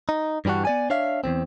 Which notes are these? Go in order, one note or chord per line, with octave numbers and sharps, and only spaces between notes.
D#4
G2 E3 G3 D4 F#4
B3 D5 G#5
D4 C#5 E5 F5
E2 G2 C4